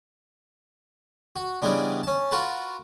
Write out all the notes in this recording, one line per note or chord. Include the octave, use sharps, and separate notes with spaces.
F#4
C#3 E3 G3 G#3 B3 D4
C#4 A5
F4 F#4 A#4 B4 A5